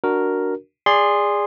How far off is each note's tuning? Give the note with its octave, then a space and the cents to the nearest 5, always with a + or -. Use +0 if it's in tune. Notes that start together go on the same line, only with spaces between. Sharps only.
D4 +0 F#4 +0 A#4 +0
G#4 -20 D5 +0 C6 +0